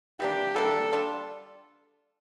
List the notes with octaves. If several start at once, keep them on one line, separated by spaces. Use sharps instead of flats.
E3 G3 A#3 D4 G4
E3 G3 A#3 D4 A4
G3 D4 F4